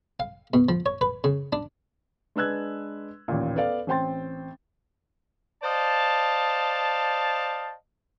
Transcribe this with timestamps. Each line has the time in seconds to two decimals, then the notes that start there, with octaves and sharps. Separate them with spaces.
0.20 F5
0.54 B2
0.69 F3
0.86 C#5
1.01 B4
1.24 C#3
1.53 D4
2.36 G#3 D4 B4 E6 F#6 G#6
3.28 A1 D#2 A#2
3.56 B3 A4 D5 F5
3.87 A1 C4 C5 G5 C6 A6
5.63 C5 D5 D#5 F5 A5